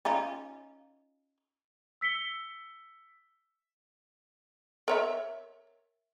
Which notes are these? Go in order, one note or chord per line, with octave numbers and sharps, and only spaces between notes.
C#4 D#4 F4
E6 B6 C#7 G7
A#4 C#5 E5